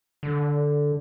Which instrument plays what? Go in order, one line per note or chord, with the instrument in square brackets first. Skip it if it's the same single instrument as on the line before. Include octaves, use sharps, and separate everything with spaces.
[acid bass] D3